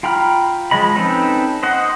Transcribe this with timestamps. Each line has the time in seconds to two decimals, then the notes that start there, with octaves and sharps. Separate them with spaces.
0.03 F4 G5 A#5 B5 F6
0.71 F3 G#3 D#5 B5
0.96 C4 C#4 D#4 A4 B4
1.63 C5 D#5 F#5